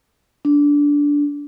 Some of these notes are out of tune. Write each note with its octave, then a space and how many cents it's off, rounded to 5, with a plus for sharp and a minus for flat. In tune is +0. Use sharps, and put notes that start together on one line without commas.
D4 -15